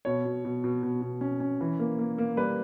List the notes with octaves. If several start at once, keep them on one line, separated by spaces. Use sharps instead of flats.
B2 C#5
B2
B2
B2
B2
B2
C#4
C#4
E3
A#3
A#3
A#3
G3 B4